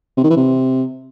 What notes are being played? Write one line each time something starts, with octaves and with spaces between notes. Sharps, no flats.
C3
D#3
E3
C3